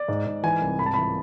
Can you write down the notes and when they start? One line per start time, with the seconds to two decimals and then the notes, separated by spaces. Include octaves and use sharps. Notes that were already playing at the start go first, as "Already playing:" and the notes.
Already playing: D5
0.08 G#2
0.26 G#2
0.43 E3 G#5
0.61 C2
0.79 G#2 B5
0.86 A5
0.93 E3 B5